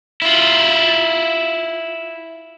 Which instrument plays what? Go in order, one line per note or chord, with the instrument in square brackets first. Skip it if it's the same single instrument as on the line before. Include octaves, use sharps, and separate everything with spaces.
[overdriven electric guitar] E4 F4